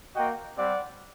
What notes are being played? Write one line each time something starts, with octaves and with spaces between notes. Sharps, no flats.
A#3 F#4 D#5 G5
G3 C4 G4 D5 F#5